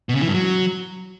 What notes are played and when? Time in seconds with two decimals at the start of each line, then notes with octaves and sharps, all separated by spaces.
0.09 B2
0.15 C#3
0.21 E3
0.28 G2
0.34 F#3